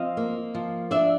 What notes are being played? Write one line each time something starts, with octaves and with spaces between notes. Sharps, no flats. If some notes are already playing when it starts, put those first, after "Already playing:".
Already playing: F3 C4 D#5 F5
A#3
F3
D4 D5 E5